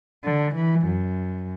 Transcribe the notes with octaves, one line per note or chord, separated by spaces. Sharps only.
D3
E3
F#2